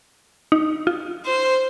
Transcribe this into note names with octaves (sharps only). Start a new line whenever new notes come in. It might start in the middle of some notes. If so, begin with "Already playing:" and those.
D#4
F4
C5